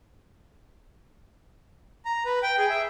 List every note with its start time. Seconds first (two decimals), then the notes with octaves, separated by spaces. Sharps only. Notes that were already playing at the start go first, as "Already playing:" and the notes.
2.05 A#5
2.25 B4
2.43 G5
2.58 G#4
2.70 E5